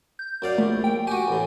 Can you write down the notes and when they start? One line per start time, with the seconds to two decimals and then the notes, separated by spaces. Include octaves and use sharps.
0.19 G6
0.42 F#2 D5 F5
0.58 A#1 A3
0.84 G5
1.07 F#4 G4 G#5
1.28 A1 A2